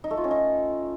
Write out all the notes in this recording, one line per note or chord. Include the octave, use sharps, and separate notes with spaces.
D#4
A3
F4
C#4
D#4